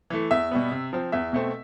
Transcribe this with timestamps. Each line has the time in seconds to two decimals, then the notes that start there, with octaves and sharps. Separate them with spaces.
0.10 E3 A3
0.31 E2 E5
0.51 B2 G3 B3
0.72 C3
0.93 F3 C4
1.12 E2 E5
1.33 B2 A3 C4